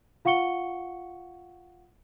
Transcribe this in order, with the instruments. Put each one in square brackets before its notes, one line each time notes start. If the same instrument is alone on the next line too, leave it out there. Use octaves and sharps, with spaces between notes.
[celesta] F4 F5 F#5 C#6 C#7 G7